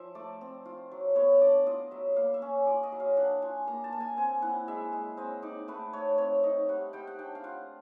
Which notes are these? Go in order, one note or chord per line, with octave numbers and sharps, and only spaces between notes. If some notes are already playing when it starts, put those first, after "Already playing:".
Already playing: F3 E5
A3 D5
C4
F4
F#3
B3 C#5
D4 D5
F4 D#5
F#3 E5
A#3 F5
E5
C#4
F4 D5
D#5
F#3
F5
D4 F#5
F4 G#5
A#3 A#5
A5
A#3
G#5
C4 G#5
E4 F#5
G#3 E5
G#3
C4 D#5
D#4 D5
A3 B4
A3 C#5
C4 C#5
D#4 D#5
G3 F#5
G3 G5
F#5
D4 G5
F5
F4 F#5